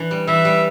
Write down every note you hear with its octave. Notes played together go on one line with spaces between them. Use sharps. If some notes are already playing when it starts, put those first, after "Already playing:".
Already playing: E3 D4
G3
E3 E5
G3